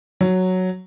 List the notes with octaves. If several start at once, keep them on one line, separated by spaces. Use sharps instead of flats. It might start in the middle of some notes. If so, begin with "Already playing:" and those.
F#3